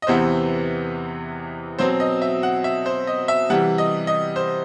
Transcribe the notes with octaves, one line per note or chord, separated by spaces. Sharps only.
D#5
E2 C3 E3 B3 C5
B2 F#3 C4 C5
D#5
E5
F#5
E5
C5
D#5
E5
C3 E3 G3 F#5
D#5
D#5
C5